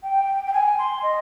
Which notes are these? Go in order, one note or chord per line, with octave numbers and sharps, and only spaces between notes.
G5
G5
G#5
C6
D#5